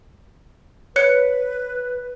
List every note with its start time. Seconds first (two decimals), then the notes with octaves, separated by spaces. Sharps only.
0.96 B4 C#5 F#6 C#7